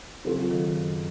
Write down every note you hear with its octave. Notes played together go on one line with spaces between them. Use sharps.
C#3 F#3 C4 F4 A4
D#3
F#2